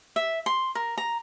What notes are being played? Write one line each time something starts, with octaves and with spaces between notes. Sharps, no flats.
E5
C6
A#4
A#5